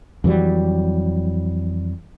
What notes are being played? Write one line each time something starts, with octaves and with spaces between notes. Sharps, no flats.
F2 E3 F#3 G3